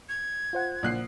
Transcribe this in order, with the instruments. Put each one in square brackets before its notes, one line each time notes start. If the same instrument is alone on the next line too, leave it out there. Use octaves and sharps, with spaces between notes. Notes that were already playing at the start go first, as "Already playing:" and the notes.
[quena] G#6
[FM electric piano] F4 C5 F#5
[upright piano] A#1 F#6 C7